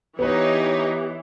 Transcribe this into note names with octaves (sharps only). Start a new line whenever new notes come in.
E3 B3 D#4 G4 B4 C#5